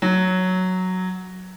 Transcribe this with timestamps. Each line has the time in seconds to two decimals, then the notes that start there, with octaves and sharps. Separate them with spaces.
0.02 F#3